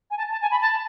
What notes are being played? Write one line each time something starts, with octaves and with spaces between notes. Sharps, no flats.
G#5
A5
A5
G#5
B5
A5